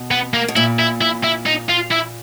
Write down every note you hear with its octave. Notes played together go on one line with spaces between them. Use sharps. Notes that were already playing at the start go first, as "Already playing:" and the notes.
Already playing: B2
B3
A#3
B2
A#2 E4
E4
E4
E4
D#4
F4
E4